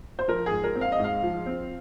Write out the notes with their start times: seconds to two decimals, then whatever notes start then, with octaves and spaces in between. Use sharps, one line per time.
0.19 C5
0.28 F3 A#4
0.46 G#2 G#4
0.64 A#4
0.75 C4
0.81 F5
0.92 D#5
0.99 G#2 F5
1.23 F3
1.46 C4